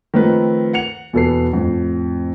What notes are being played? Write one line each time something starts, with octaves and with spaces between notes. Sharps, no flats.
D#3 F3 A3 C4 B4
F#5 C#7 F7
E2 B2 A4 B4 C7
F2 A2